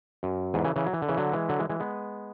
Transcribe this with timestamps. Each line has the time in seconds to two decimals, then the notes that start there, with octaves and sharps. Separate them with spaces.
0.23 F#2
0.54 E2 G#2
0.65 C#3 E3
0.76 C#3 E3
0.86 F#3
0.93 E3
1.02 D3
1.09 C#3 E3
1.17 D3 F#3
1.33 E3 G#3
1.49 D3 F#3
1.59 E3 G#3
1.70 E3 G#3
1.80 G#3 B3